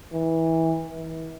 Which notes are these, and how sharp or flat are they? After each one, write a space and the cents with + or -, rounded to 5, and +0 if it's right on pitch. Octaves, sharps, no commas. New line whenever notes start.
E3 -20
E3 -35